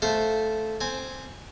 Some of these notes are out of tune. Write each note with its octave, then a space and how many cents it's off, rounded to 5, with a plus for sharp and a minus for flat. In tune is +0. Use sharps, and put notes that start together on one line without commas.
A3 -10 C5 +0 F5 +0
C4 +0 G#5 +0